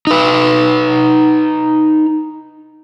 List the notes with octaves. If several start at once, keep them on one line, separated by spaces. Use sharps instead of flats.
D#4 B4